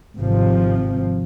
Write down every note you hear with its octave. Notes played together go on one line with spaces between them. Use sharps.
G#1 C3 F3